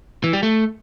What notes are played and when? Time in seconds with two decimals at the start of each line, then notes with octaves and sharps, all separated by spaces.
0.24 E3
0.33 G3
0.43 A3